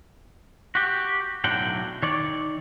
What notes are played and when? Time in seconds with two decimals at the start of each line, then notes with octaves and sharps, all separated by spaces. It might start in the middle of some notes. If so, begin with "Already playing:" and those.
0.75 F#4 G4
1.44 B1 A2 D3 F#3 F#5 G5
2.03 D#3 C#5 D5